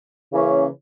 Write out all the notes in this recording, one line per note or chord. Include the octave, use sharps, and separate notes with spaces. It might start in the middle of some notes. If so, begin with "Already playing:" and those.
C#3 E3 A#3 C#4